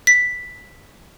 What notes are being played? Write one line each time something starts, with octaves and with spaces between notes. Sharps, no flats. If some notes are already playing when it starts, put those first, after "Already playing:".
B6